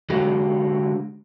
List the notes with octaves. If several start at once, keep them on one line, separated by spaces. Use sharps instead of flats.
D3 G#3 F#4 G4 F5